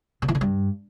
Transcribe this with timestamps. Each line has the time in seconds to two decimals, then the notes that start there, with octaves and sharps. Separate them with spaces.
0.22 C#3
0.28 E3
0.35 D3
0.41 G2